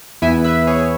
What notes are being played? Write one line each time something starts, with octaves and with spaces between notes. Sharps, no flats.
E2 E3 B3 E4 E5 G#5
B4 E5
G#4 C#5